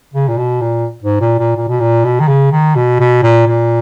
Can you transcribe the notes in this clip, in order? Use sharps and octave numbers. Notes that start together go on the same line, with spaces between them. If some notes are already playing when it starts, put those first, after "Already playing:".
C#3
A#2
B2
A#2
G#2
A#2
A#2
A#2
B2
A#2
B2
D#3
C#3
D#3
B2
B2
A#2
A#2